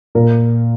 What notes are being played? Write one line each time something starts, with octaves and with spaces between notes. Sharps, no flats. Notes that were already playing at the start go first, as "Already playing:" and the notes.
A#2 A#4